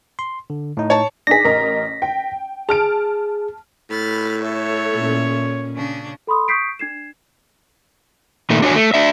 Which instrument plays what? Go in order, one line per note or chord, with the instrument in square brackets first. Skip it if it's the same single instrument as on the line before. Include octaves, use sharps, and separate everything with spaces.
[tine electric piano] C6
D3
A2 D#4
[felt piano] C#5 A5
[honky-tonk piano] D4 D#4 G#4 [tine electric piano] A#6 B6
[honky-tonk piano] A1 A#4 D#5
G5
[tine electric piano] G#4 [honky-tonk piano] A5 F6 D7
[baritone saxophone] A2 [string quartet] B5 F6 A6
[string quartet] A4 E5 [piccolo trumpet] C#5
[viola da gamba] A#2 C#4
[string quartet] C#3 C#4 D4
[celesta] A4 B5 C6 D#6
C#6 D#6 G6 B6 C7 D7
D4 G#6 C7 E7
[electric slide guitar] A#2 D#3 A3
D4 F#4 C#5 G#5
A3
D4 E5